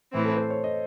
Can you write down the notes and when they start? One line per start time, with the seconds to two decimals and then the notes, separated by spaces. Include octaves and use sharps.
0.12 A2 E3 C4
0.25 A4
0.37 C5
0.50 C#5
0.64 D#5